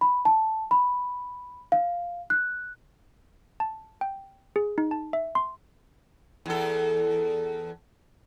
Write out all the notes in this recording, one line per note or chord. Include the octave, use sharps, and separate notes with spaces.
B5
A5
B5
F5
F#6
A5
G5
G#4
D#4
A5
E5
C6
E2 A4